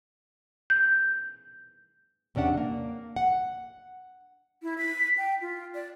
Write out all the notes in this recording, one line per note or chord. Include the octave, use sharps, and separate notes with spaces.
G6
E2 C3 C#4 D4 F#5
A#3
F#5
E4
B6
G5
F4
D5